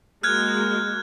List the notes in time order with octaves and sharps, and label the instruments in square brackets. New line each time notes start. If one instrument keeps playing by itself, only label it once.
[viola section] G#3 A#3 F#4 [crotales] F6 F#6 G#6